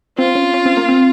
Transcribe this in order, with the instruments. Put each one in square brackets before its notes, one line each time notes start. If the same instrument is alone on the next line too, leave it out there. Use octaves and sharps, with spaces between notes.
[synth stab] C4 [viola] F4
[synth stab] C#4
C#4
C4
A#3
C4